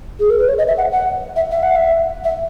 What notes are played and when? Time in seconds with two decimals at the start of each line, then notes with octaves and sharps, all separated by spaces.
0.20 G#4
0.30 A#4
0.38 B4
0.48 C#5
0.58 D#5
0.68 E5
0.77 F#5
0.92 F#5
1.36 E5
1.51 E5
1.63 F#5
1.75 E5
2.24 E5